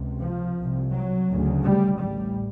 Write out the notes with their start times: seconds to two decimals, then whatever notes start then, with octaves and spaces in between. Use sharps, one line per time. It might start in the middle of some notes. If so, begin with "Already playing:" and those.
Already playing: C#2 C3
0.21 F3
0.58 C2 C3
0.93 F#3
1.30 D2 C#3
1.66 G3
2.02 A1 A2 G3